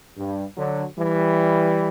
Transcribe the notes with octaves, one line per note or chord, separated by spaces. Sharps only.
G2
D3 F#3
E3 G3